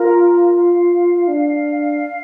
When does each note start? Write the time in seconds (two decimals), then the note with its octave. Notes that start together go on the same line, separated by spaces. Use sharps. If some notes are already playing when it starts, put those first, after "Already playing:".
Already playing: F4 A#4
0.54 F5
1.28 D4